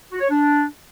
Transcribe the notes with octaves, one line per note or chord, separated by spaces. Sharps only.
F#4
C#5
D4